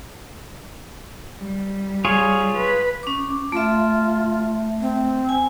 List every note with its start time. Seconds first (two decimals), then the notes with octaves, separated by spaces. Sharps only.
1.40 G3
2.05 F4 G#4 C#5
2.57 B4
3.03 C#4 D6
3.52 A3 F4 E5
4.81 C4
5.29 G#5